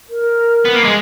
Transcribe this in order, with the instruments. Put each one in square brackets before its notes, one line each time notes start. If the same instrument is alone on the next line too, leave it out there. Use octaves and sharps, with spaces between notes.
[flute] A#4
[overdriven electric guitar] B3
A#3
G#3